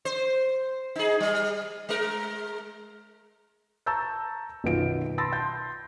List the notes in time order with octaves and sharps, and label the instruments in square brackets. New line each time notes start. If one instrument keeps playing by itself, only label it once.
[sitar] C5
D#4 G#4
G3
G#3 A#4
[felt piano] A5 A#5 C#6 E6 G6 A6
B1 F#2 D#3 B3 F4 D7
A5 B5 C6 E6 A6 A#6
C6 G6